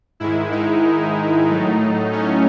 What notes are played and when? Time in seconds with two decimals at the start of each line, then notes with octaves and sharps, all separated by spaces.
0.20 G#2 D#3 G#3 E4
0.52 D#4
1.48 A2 F#3 A3
2.12 C#4